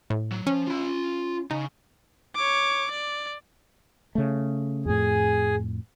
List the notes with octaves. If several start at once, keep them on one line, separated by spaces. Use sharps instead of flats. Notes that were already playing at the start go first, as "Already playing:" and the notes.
A2
F#3
F3 C#4
F4 B5
C#3 D#4
C#5 D6
D5
C#3 A3
F2 A2 G#4